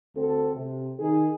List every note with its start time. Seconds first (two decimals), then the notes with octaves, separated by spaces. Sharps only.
0.15 D2 C4 A4
0.55 C3
0.99 D#3 D#4 G#4